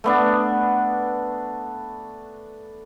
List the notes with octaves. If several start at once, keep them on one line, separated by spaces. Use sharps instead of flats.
A3 B3 D4